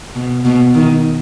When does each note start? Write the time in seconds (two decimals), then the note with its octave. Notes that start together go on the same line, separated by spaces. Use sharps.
0.15 B2
0.45 B2
0.75 D#3